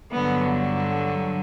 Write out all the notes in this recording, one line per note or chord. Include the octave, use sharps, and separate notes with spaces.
G2 D3 F#3 B3